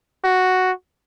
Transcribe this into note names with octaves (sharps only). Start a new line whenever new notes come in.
F#4